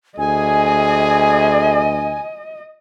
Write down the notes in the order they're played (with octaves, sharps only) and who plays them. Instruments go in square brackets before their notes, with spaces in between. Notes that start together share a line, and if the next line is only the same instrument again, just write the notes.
[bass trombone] D2 [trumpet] G#4 [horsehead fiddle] D#5 [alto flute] G#5